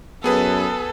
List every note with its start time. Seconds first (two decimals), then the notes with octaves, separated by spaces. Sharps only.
0.24 F#2 B3 G#4 A4 B4